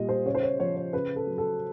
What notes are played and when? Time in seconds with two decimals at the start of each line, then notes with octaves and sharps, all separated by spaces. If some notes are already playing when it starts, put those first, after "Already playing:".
Already playing: A#2 G3 D#5
0.09 C5
0.26 C#3 C#5
0.35 C5
0.43 C#5
0.60 F3 C#5
0.76 C#5
0.93 C#3 B4
1.16 A4
1.27 F#3
1.38 A4